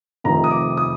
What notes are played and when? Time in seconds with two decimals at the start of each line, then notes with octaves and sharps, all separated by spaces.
0.24 F1 F2 C3 D#3 A#5
0.44 D#6
0.51 D6
0.77 D#6